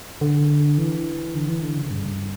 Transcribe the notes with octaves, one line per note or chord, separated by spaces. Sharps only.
D3
E3
D3
E3
D3
C#3
G2